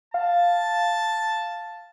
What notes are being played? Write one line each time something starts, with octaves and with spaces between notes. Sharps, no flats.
F5 A5